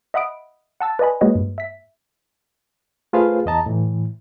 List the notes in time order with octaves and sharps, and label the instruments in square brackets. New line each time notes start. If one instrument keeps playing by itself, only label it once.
[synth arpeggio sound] D#5 E5 F#5 B5 D#6 D7
F#5 A5 E6 A6
B4 D5 D#5 G#5 B5
G#3 A#3 F#4 B4 C#5 D#5
G2
E5 B6
[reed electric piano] A3 F4 G#4 B4 C5 F5
E2 D#5 A5 A#5
A2 E3